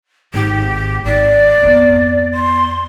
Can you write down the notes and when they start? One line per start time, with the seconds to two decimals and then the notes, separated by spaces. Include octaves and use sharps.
0.34 G#1 G4
1.05 G#1 D5
1.61 F2 B3
2.34 C6